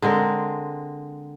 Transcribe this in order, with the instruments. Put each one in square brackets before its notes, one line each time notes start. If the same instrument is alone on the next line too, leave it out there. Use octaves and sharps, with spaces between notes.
[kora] D3 G#3 C4 A#4